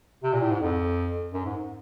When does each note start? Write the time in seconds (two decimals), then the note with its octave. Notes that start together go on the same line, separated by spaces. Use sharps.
0.24 C3
0.33 A#2
0.42 A2
0.51 G#2
0.60 F2
1.33 F#2
1.46 G#2